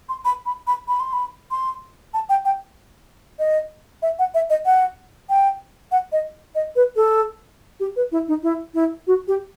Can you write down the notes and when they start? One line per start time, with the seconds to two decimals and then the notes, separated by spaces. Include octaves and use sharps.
0.09 C6
0.25 B5
0.46 B5
0.67 B5
0.88 B5
1.00 C6
1.13 B5
1.51 C6
2.14 A5
2.29 G5
2.45 G5
3.39 D#5
4.02 E5
4.19 F#5
4.34 E5
4.50 D#5
4.66 F#5
5.29 G5
5.92 F#5
6.12 D#5
6.55 D#5
6.76 B4
6.96 A4
7.80 G4
7.96 B4
8.12 E4
8.28 D#4
8.43 E4
8.74 E4
9.07 F#4
9.28 G4